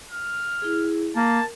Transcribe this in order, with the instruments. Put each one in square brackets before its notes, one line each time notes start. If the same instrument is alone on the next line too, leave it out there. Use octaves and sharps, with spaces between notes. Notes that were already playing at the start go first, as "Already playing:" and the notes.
[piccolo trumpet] F6
[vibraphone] E4 G#4
[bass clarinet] A#3 [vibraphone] A#4 [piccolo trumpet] A5